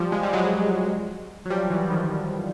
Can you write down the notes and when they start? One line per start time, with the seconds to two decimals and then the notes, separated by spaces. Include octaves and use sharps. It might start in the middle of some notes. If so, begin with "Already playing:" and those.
Already playing: F3 G3
0.12 G#3
0.23 G3
0.33 F#3 G#3
1.46 F#3
1.50 F3 G3
1.70 E3 F#3
1.85 E3
1.90 D#3 F3